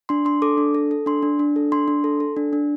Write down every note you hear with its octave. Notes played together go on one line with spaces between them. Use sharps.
D4 C6
D4 C6
A4 D6
D4
A4
A4
D4 C6
D4
D4
A4
D4 C6
D4
A4
A4
D4
D4